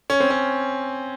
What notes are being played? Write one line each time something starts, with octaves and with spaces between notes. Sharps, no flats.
C#4
C4
C#4